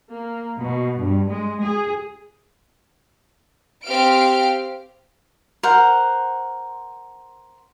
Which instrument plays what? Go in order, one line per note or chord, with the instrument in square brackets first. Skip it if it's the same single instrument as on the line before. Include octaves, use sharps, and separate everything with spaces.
[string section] A#3
B2
G2
G#3
G#4
[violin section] C4 G4 F5 F6 D7
[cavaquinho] A#4 C5 F#5